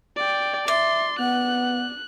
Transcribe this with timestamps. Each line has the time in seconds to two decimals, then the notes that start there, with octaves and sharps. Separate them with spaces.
0.16 D5 G5
0.68 D5 E5 C6
1.19 B3 F#5 F#6